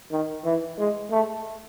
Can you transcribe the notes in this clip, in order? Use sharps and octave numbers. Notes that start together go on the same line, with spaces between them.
D#3
E3
G#3
A3